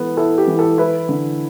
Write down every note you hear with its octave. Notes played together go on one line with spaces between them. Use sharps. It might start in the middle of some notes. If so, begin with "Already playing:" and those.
Already playing: E3 B3 A4
E4 A4
G4
E3
A4
E4 B4
D3